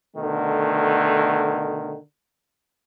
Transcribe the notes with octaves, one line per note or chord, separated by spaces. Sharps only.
B2 D3 D#3 A3